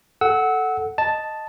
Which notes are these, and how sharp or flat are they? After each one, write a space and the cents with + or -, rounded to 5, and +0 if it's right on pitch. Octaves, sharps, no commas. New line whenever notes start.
A4 +0 F#5 +5 E6 -25
D#5 +0 A5 +0